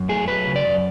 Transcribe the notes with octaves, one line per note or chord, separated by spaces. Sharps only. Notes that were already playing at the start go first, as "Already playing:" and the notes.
Already playing: F#2
A3 G#4
F#3 B4
C#3
D5
F#2